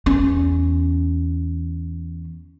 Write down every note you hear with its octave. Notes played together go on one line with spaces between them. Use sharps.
E2 C#4